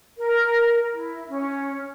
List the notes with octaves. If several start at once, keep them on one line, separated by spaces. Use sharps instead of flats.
A#4
E4
C#4